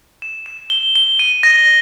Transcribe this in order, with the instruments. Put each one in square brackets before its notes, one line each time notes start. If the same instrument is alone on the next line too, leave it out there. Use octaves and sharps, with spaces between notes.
[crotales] E7
E7
G7
G7
D#7
A#6